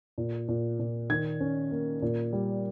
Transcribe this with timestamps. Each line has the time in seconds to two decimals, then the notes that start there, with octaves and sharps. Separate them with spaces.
0.18 A#2
0.48 A#2
0.79 A#2
1.10 D#3 G#6
1.40 C#4
1.71 A#3
2.02 A#2
2.33 G3